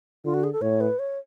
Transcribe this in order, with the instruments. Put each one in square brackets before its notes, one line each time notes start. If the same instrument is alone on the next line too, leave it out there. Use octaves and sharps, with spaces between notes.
[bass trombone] D3 [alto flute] F4
[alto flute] F#4
G#4
A4
[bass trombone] A2 [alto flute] C#5
[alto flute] B4
C#5